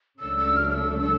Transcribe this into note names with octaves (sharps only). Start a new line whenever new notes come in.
C#2 C#3 F#3 A3 D4 E6
E6
F6
F6
E6
E6